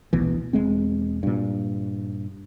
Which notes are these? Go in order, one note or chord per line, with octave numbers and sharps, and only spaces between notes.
D1 A#1 B2 E3
E1 G#3 C4
G2 A#2